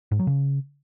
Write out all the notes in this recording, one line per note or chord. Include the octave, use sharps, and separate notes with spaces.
G#2
F#3
C#3